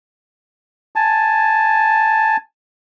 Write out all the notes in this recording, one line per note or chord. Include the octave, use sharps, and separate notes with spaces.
G#5 A5